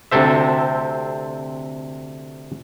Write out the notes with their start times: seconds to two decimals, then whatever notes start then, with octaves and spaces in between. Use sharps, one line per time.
0.11 D2 C3 C4 A4 C5 E5